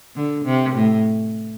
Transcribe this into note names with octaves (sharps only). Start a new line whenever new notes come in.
D3
C3
A2